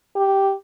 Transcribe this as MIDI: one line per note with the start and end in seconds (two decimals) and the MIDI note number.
0.16 0.54 67